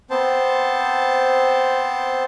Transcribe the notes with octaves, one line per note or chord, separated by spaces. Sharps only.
B3 C4 C5 A5